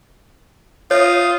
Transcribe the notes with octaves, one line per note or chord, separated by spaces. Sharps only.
F4 C#5 E5 D#6